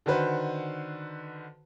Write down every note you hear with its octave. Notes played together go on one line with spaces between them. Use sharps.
D3 D#3 F#4 B4 C5